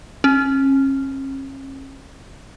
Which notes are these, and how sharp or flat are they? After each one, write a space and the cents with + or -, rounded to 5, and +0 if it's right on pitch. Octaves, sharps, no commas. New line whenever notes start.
C#4 -40